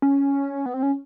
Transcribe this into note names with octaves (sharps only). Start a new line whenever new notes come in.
C#4
B3
C4
C#4